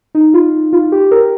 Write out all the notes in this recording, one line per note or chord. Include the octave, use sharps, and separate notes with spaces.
D#4
F4
F4
G4
A#4